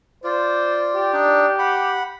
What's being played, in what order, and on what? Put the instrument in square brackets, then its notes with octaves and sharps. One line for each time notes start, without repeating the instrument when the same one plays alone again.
[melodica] F4 D5 [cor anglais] C5
[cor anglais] G4
[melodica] D4 D#4 D5
F#5 B5